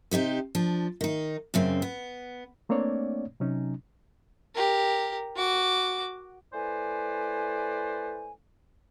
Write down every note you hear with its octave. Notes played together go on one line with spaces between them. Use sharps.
C3 D#4 G4 C5
F3 D4
D#3 D#4
F#2 C#3 C4
B3
A3 A#3 C4 D4 C#5 D5
C3 F#3 C#4 D#4
G4 A#4
F#4 D6
A3 E4 B4 C5 D5 G#5